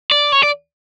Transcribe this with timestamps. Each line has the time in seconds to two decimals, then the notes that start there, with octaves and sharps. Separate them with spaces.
0.11 D5
0.32 C#5
0.43 D5